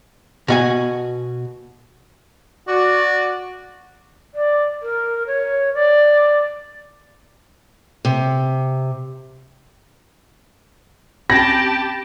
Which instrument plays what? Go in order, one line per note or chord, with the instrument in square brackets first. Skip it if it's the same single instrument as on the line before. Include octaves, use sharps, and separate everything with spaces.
[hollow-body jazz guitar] B2 F#4 G#5
[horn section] F#4 D5
[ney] D5
A#4
C#5
D5
[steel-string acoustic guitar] C3
[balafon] C4 C#4 [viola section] G4 A5 [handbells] B5 [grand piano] A#6